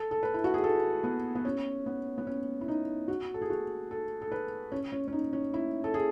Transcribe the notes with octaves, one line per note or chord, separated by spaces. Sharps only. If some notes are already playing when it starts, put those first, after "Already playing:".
Already playing: A4
A4
B4
E4
F#4
G#4
A4
B3
B3
C#4
B3
B3
C#4
E4
D#4
F#4
A4
G#4
F#4
A4
A4
B4
C#4
C#4
C#4
D#4
C#4
E4
A4
G#4